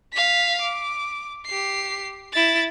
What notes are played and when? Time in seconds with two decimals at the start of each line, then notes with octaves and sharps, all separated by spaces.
0.13 F5 B6
0.61 D6
1.47 G4 C7
2.33 E4 A6